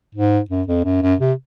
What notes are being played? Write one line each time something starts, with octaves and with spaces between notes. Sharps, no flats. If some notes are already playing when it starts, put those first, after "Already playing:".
G#2
F#2
F2
F#2
F#2
C3